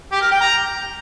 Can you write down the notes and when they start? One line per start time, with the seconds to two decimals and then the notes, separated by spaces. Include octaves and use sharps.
0.11 G4
0.21 A#4
0.31 G5
0.41 A#5